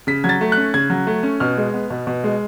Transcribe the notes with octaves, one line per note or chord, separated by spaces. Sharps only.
C#3 B6
F#3 G#6
A6
A3
F#6
C#4
C#3 G#6
F#3
A3
C#4
B2 F6
G#3
B3
B2
B2
G#3